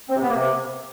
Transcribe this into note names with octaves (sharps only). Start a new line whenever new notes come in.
C4
C3
B3
A#3
C3